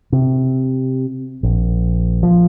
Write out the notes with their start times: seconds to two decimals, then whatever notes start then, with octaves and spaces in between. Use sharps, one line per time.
0.12 C3
1.43 A#1
2.23 F3